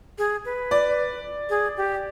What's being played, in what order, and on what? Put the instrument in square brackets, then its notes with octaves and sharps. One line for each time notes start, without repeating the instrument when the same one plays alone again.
[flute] G#4
B4
[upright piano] D5
[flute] G#4
G4